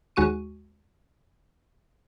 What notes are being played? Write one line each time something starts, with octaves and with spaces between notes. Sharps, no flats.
D#2 G#3 F#4 C#6 D#7